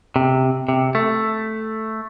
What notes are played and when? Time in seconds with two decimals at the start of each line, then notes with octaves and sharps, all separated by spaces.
0.16 C3
0.69 C3
0.95 A3